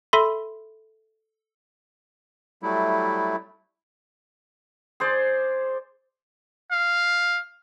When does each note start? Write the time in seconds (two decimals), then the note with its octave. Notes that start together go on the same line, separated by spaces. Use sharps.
0.13 A4 E5 B5 C6
2.63 F#3 G3 A3 E4
5.00 G#4 C5 D5
6.72 F5